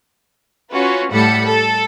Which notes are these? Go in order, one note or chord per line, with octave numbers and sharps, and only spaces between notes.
C#4 F4 F#4 B4
A2 G3 A4 F#5 B5 C#7
A4